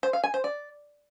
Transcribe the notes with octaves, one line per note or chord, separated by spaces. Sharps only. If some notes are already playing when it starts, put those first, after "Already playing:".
C5
F5
G#5
C5
D5